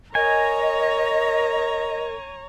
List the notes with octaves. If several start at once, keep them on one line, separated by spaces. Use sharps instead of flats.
A#4 C#5 D#5 G#5 A#5